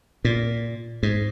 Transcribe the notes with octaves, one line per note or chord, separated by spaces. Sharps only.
A#2
G#2